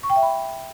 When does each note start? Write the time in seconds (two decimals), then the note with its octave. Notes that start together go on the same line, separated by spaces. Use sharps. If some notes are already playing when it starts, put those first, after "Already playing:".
0.03 C#6
0.10 G5
0.16 E5
0.22 B5